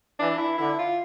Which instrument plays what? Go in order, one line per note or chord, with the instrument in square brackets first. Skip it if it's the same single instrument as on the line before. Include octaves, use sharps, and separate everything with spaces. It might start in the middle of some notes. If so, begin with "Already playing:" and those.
[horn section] E3 [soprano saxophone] D4
[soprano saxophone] E4
[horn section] D3 [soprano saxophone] E4
[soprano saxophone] F4